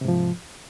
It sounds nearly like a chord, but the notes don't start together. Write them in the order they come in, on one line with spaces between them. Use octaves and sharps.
C3 G#2 F3